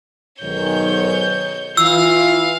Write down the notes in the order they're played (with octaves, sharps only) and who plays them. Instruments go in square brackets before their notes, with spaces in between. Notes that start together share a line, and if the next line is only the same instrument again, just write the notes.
[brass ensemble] B1 G#2 D#3 [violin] C#5 G6
[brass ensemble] E3 F4 [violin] F5 [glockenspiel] E6